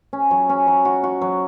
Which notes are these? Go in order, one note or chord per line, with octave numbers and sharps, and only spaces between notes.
C#4
F#3
C#4
F#3
F#4
F#4
F#3